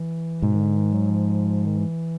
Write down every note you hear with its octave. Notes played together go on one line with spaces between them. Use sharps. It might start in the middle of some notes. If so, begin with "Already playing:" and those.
Already playing: E3
G#2 B2
D#3
D3
D#3
F#3
F3
D#3
E3